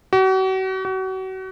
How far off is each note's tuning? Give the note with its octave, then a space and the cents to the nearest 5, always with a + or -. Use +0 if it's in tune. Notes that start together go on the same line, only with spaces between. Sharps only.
F#4 +40
F#4 +35